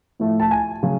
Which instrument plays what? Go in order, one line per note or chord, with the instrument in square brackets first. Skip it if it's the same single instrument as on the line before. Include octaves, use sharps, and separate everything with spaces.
[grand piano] A2 F3 A3
A5
G#5
C#3 F#3